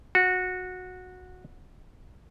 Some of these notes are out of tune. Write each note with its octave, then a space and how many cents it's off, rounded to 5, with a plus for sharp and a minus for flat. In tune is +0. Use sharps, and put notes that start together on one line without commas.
F#4 -15